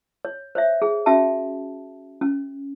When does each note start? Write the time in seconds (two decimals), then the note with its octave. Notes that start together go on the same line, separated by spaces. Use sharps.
0.25 C#5
0.55 C5 C#5 E5
0.82 G#4
1.06 C#4 F#4 E5 G5 A5
2.21 C#4